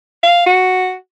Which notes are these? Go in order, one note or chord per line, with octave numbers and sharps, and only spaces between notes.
F5
F#4